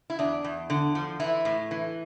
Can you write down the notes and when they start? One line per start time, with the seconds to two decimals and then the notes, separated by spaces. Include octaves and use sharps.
0.10 E4
0.19 E2 D4
0.44 E2
0.70 D3
0.95 F3
1.20 E3 E4
1.45 A2
1.71 E3